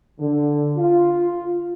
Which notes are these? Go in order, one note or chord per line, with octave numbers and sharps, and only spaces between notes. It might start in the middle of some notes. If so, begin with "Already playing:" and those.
D3
F4